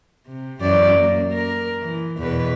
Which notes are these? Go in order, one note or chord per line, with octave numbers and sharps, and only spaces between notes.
C3
F#2 E3 D5
A#3
A#4
E3
E2 B2 B4